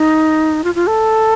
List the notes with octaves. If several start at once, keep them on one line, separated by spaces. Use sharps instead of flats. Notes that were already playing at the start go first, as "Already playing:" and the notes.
Already playing: D#4
F4
F4
A4